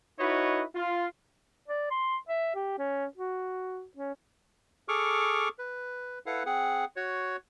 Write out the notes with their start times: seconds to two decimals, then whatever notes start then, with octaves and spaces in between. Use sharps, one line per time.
0.20 D#4 E4 F#4 B4 C#5 D#5
0.76 F4
1.68 D5
1.91 C6
2.29 E5
2.55 G4
2.79 C#4
3.17 F#4
3.97 C#4
4.88 G#4 A4 C#6 D6 F6
5.59 B4
6.26 E4 A4 B4 F5 F#5
6.46 C4 G#4 F#5
6.96 F#4 C#5